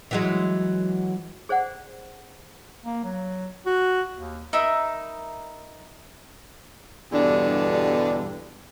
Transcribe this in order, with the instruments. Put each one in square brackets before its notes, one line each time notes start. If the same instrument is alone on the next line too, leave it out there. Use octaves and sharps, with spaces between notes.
[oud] E3 F#3 G#3
[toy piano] G#4 C5 D5 F#5
[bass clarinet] A#3
F#3
F#4
D#2
[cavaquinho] D#4 A#4 E5 B5
[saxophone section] E2 G2 B2 D3 G3 D4